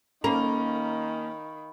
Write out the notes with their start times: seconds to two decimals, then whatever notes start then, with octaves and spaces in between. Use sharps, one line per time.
0.24 D#3 A#3 C#4 A#5 B5